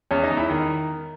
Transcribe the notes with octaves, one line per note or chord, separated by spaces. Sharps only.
E2 C#4 C#5
D#4 D#5
E2
E4 E5
D#3